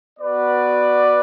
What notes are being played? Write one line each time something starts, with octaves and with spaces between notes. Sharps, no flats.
B3 F#4 B4 D5